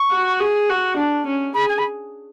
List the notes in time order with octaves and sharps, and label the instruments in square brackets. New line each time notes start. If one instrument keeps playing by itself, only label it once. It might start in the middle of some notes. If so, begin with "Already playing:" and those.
Already playing: [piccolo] C#6
[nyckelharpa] F#4
G#4
F#4
D4
C#4
[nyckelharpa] G#4 [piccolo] B5
[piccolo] G#5
B5